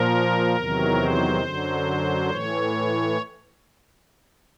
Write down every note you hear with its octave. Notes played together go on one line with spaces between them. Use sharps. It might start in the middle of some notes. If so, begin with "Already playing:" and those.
Already playing: A#2 F3 A#4
E2 C3 D#3 F#3
C5
F#2 D3 F#3
A2 E3 C#5